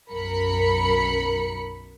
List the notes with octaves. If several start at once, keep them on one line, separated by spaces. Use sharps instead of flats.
B1 F#2 A#4 B5 C#7